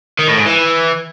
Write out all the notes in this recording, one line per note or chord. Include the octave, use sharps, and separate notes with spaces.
D#3
A2
G#2
E3